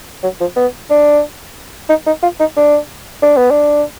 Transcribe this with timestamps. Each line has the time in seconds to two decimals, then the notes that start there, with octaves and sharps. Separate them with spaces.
0.23 F#3
0.41 F3
0.56 B3
0.91 D4
1.89 D#4
2.07 D#4
2.23 F4
2.40 D#4
2.57 D4
3.22 D4
3.37 B3
3.51 D4